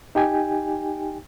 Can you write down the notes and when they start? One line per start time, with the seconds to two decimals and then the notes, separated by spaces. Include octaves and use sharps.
0.15 D#4 G4 G5 G#5